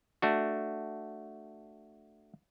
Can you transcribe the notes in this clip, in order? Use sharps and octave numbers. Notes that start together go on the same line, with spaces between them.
A3 D4 F#4